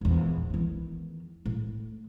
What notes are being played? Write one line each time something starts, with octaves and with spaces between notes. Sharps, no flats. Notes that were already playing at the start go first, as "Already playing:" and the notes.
A#1 E2
E2 D#3
A2